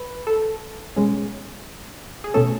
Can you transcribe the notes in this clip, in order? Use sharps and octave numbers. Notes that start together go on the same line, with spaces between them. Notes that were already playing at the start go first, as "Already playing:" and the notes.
Already playing: B4
A4
B2 G#3 C#4
G#4
B2 A3 C#4 A4